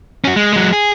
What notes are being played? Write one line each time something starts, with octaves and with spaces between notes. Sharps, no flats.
C#4 F#4
G#3
F#3 G#3
G#4